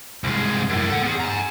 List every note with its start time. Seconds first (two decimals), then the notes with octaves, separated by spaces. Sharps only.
0.24 C2 G#3
0.70 F#2 A2
0.89 A4 F#5
1.02 B3 G#4
1.20 G#5 A#5